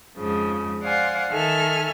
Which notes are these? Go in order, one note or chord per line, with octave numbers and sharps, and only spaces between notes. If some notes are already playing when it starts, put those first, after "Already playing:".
F2 G#2 C#3 F3
C5 D5 F5 F#5 G#5 C6
D#3 A4 E5 G#5 F6